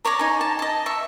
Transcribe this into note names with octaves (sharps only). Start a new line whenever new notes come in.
A#4 C#5 D5 A#5
D#4 G#5
A5
D#5 A5
E5 C#6